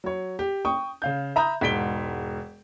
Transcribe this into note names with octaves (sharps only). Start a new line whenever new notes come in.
F#3 C#5
G4
G5 C#6 D#6
C#3 F5 G6
E5 A#5 B5 D#6 G6
E1 G#2 B6 D7 G7